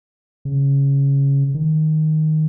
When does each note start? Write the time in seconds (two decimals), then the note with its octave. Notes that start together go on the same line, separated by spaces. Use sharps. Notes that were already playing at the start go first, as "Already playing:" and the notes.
0.45 C#3
1.54 D#3